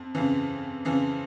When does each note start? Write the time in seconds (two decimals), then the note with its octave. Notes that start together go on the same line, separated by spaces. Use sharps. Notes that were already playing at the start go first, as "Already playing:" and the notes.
Already playing: F2
0.15 F2 C#3 E3
0.85 F2 C#3 E3